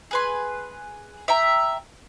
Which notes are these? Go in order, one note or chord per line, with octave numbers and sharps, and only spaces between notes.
G#4 B4 C6
E5 G5 A#5